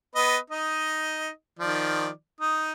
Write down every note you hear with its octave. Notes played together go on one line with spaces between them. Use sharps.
B3 B4 D#5
D#4 D#5
D#3 F3 D5
D#4 D#6